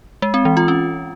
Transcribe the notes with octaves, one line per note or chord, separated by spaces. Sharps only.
G#3
C4
E3
F4
C#4